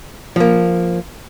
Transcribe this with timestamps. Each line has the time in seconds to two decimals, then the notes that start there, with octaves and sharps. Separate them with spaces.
0.36 F3 A#3